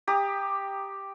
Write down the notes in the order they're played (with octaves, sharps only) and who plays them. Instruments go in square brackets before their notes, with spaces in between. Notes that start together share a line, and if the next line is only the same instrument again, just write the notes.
[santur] G4 A#5 D6 D#6